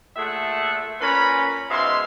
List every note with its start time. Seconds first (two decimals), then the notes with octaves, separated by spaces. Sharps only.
0.16 A#2 A3 G#4 E5 F#5
1.00 A#2 C#4 A#4 B4 B5
1.70 G#2 B2 G#3 E5 F5 C6